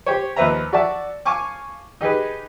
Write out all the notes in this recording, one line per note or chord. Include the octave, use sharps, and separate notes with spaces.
G4 C5 C#5
D#2 F3 B4 C5 E5 A#5
F#4 D5 E5 A5
F5 G#5 A5 C#6 D6
D#4 G4 G#4 B4